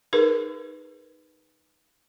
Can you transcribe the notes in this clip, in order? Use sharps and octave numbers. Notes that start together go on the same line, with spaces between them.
D#4 G#4 A#4 B4